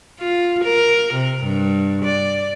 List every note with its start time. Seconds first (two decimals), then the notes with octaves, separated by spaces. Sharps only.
0.20 F4
0.64 A#4
1.13 C3
1.44 G2
2.05 D5